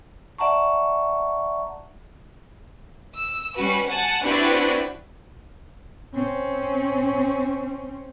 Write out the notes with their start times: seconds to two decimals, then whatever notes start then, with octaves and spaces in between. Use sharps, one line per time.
0.39 D5 E5 F#5 A5 A#5 C#6
3.16 E6
3.57 G3 C#4 F#4 B4
3.87 F#5 G#5 A5
4.23 C4 D4 E4 F#4 G4 B4
6.14 C4 C#4